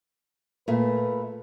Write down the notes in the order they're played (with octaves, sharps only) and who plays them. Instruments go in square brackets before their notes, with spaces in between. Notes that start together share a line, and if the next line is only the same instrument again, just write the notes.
[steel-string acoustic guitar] A#2 A3 [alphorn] B4